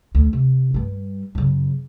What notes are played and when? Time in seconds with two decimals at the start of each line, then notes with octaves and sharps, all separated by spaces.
0.15 D2
0.33 C3
0.74 G2 G3
1.35 F#2 C#3